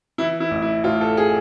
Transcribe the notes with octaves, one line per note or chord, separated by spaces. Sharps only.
E3 E4
E4
A1
E4
A2 F4
A4
G#4